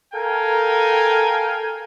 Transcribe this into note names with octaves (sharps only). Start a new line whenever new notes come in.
A4 A#4 F5 G5 G#5